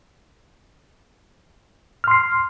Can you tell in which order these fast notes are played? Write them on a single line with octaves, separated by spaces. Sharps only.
F6 C6 C7